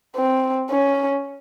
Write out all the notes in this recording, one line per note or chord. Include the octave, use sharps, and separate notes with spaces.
C4
C#4